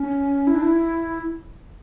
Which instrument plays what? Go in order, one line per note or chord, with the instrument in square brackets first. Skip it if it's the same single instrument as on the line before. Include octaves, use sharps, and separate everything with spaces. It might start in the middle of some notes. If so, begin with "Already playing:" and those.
Already playing: [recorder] C#4
E4
D4
E4